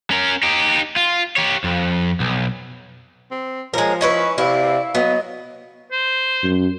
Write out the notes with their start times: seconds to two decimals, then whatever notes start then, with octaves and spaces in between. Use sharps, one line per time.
0.11 C#4 A#4
0.43 D#4 G4
0.96 F4
1.36 G4 C#5
1.64 F2
2.20 B1
3.31 C4
3.73 F3 G#3 A#4 C#5
4.01 C#4 E4 B4 D#5 C#6
4.38 C3 E4 D5 F5
4.95 F#3 B3 D#5
5.91 C5
6.43 F#2